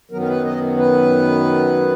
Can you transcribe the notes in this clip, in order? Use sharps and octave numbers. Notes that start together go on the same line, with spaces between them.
F#2 D#3 F#3 B3 A#4
A#4
B4
D#5
B4